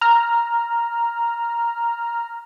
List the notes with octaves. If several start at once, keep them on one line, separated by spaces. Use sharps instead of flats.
A#5 F6